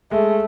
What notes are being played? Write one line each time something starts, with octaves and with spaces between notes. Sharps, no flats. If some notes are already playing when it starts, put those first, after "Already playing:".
G#3 A3